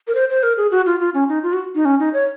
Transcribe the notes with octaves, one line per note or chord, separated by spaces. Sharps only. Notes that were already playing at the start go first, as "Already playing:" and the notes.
A#4
C5
C5
A#4
G#4
F#4
F4
F4
C#4
D#4
F4
F#4
D#4
C#4
D#4
C#5